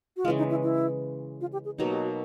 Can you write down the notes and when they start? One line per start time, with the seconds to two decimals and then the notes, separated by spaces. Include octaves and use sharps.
0.17 F#4
0.25 G#3 F4
0.28 C#3 E3
0.38 D#4
0.50 E4
0.63 E4
1.41 F4
1.53 G4
1.65 G#4
1.78 B2 F#3 A#3 D#4 G4
1.91 G4
2.04 F#4